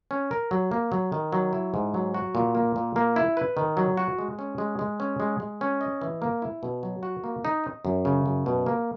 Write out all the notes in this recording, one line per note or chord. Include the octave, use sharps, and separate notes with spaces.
C#4
A#4
F#3
A#3
F#3
D#3
F#3
E4
G#2
F#3
F#4
A#2
A#3
A#2
A#3
E4
B4
D#3
F#3
F#4
G#3
C#4
G#3
G#3
C#4
G#3
G#3
C#4
D#5
E3
A#3
E4
B2
F#3
F#4
A#3
D#4
D#5
F#2
C#3
F#2
B2
A#3